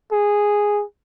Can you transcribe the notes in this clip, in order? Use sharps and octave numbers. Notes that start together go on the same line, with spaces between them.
G#4